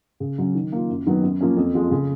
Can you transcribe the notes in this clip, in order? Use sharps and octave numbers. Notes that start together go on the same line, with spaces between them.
C#3
F#3 C#4
D#3
A#3 F4
F#2
D#3 F#3 B3
F#2
F3 A#3 C#4
F2
F3 G#3
C#3